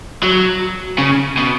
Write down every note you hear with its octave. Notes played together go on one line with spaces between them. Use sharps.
F#3
C#3
B2